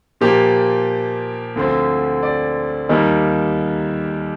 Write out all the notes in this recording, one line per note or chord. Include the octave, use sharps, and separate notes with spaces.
A#2 F3 A#3 G4
D2 D3 F3 C4
D5
D#2 D#3 G3 A#3